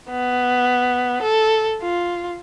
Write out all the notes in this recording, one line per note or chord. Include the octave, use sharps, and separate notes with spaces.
B3
A4
F4